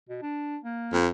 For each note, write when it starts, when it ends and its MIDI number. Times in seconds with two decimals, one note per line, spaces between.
0.09 0.20 47
0.22 0.57 62
0.64 0.98 58
0.93 1.08 41